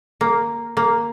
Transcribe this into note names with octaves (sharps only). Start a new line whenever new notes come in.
A#3
A#3